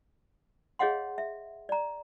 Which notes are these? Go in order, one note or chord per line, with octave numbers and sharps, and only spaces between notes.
G#4 C#5 D#5 F5 F#5 C6
E5
D5 A#5